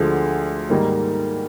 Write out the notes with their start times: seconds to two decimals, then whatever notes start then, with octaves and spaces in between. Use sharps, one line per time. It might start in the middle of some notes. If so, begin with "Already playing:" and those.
Already playing: D2 D3 F3 G#3
0.70 G#2 D#3 G3 A#3